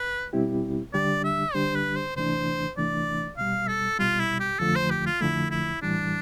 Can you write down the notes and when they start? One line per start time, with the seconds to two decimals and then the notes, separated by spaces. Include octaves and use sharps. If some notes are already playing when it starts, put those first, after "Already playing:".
Already playing: B4
0.33 B2 G3 C4 E4 G4
0.93 D3 G3 D4 G4 D5
1.24 E5
1.54 D3 G3 D4 G4 C5
1.75 B4
1.96 C5
2.16 D2 C3 E3 A3 D4 C5
2.77 D2 C3 E3 A3 D4 D5
3.37 C2 B2 G3 F5
3.68 A4
3.99 C2 B2 G3 F4
4.19 E4
4.40 G4
4.59 F2 D3 F3 A3 A4
4.75 C5
4.90 G4
5.06 F4
5.21 F2 D3 F3 A3 E4
5.51 E4
5.82 A2 E3 G3 D4